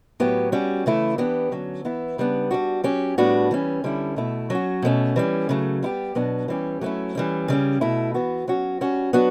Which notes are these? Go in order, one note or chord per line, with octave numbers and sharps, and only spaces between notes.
A2 F#3 B3 E4 G4
G3 C#4 F#4
C#3 E3 A3 E4
E3 B3 D4 G4
D3 F#3 C#4
E3 B3 E4
C#3 G3 B3 D4
G3 D4 F#4
F#3 C#4 G4
A2 G3 B3 D4 F#4
E3 G3 C#4
D3 G3 C#4 E4
B2 A3 E4
F#3 C#4 F#4
B2 A3 C#4
E3 G3 C#4
C#3 F#3 A3
G3 B3 E4 G4
B2 F#3 B3 D4
E3 G3 C#4 G4
F#3 A3 C#4 E4
E3 G3 C#4
C#3 G3 C#4
B2 A3 E4
E3 B3 F#4
F#3 C#4 F#4
G3 C#4 F#4
F#3 B3 D4 F#4